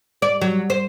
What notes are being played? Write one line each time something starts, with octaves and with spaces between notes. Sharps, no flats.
D5
F#3
C5